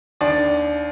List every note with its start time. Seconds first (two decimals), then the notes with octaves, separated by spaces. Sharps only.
0.21 D#2 D4 D5